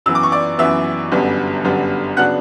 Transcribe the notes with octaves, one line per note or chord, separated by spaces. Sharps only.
F#2 E3 B3 E6
D6
C#6
D5 D6
F#2 E3 B3 E5 E6
G1 F#2 D3 G3 B3
G1 F#2 D3 G3 B3
C#3 F#3 B3 D4 F#5 F#6